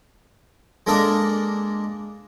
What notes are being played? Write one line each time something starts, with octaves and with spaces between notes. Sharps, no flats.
G#3 A#3 D4 A4 A#4 D#5